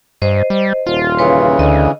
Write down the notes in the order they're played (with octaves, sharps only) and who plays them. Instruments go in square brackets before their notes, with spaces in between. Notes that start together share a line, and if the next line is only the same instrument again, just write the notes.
[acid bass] G2 [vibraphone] C5 D#5
[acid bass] G3
[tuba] D#1 [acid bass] F4
[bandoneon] C#3 E3 [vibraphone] B4 C#5 C6
[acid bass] D2 [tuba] D3 [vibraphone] D#5